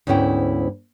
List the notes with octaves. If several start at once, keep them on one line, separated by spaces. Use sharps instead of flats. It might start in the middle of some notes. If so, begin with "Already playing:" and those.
D2 G#2 B3 C#4 E4 G5